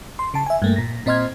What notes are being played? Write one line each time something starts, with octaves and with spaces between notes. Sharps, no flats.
C6
C#3 A5
E5 G#5
G2 A3 A#3
A#2 A#6
A#2 C4 D#5 C6 F6 G#6